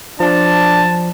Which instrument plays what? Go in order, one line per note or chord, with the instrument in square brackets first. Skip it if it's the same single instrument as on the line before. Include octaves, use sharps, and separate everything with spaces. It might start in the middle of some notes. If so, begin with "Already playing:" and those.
[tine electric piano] F3 [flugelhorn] D4 [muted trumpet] A5